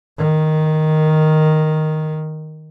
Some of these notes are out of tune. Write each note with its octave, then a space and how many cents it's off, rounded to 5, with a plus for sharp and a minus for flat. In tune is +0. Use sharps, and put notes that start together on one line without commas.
D#3 +0